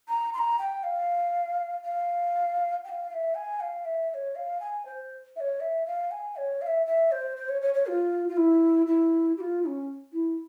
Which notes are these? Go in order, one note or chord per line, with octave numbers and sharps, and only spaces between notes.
A#5
C6
A#5
G5
F5
F5
G5
F5
F5
E5
G#5
F5
E5
E5
C#5
F5
G#5
C5
E5
C#5
E5
F5
G#5
C#5
F5
E5
E5
C5
C5
C#5
C#5
C#5
F4
F4
E4
E4
G4
F4
E4
C#4
E4